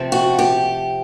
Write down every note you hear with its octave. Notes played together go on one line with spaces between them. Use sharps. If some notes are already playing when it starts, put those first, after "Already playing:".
Already playing: C3 F3 A3 C4
F#4
G4